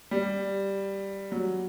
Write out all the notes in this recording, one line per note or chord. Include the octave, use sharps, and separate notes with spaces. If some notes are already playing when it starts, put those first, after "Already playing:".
G3
F#3